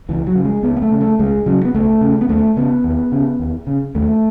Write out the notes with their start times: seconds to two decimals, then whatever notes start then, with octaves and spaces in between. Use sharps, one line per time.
0.09 C#2 E3
0.27 F#3
0.35 C#3
0.45 G#3
0.63 C#2 B3
0.77 B3
0.82 A3
0.91 C#3
1.01 A3
1.19 C#2 G#3
1.46 C#3 F#3
1.65 B3
1.74 C#2 A3
2.01 C#3
2.21 B3
2.29 D#2 A3
2.56 C#3 B3
2.84 D#2
3.12 C#3
3.39 D#2
3.67 C#3
3.95 D#2 A3